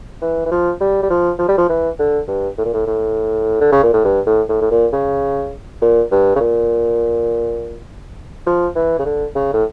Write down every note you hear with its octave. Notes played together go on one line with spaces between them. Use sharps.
E3
E3
F3
G3
G3
F3
F3
G3
F3
E3
D3
G2
A2
A#2
A2
A2
D3
C#3
A#2
A2
G2
A2
A2
A2
A#2
C#3
A#2
G2
C#3
A#2
F3
E3
C#3
D3
C#3
A2